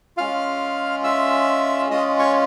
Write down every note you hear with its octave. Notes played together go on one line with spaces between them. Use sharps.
G#3 C#4 F4 F5 F6
E5 E6
G#3 C#4 F4 D#5 D#6
C#5 C#6